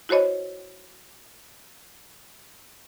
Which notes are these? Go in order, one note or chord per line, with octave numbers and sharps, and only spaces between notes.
E4 F#4 C5 C#5 D#5